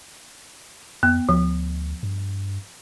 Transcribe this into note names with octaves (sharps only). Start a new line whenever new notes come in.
F2 B3
D2 F3
G2